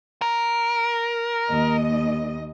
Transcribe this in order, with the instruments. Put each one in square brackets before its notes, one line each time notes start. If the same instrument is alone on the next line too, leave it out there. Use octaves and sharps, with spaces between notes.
[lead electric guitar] A#4
[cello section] D#2 D#5